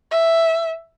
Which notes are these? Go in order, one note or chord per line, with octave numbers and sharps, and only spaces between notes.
E5